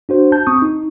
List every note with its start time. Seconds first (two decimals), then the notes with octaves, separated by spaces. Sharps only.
0.09 D4 F#4 C5
0.32 A5 G6
0.47 C4 C#6 D#6
0.62 D#4